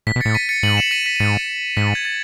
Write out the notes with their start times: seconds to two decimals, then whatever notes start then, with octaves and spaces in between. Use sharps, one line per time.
0.07 A2 B6
0.16 B2
0.21 A6 C#7
0.25 A2
0.34 B6 D#7
0.49 A6 C#7
0.63 G#2 D#7 F#7
0.77 C#7 E7
0.91 B6 D#7
1.06 B6 D#7
1.16 D#7
1.20 G#2 A6 C#7
1.77 G#2 B6
1.87 A6
1.95 G#6
2.05 A6